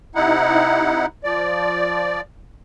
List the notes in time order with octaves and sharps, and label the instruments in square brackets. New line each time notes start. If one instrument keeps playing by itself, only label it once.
[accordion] C3 D#4 E4 F#5
F3 D5